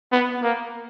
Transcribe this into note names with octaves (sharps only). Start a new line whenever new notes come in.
B3
A#3